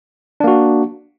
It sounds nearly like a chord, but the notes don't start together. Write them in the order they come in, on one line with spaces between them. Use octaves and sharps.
D4 A#3 F#4